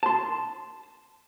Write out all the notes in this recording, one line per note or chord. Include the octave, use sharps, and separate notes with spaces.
A5 C6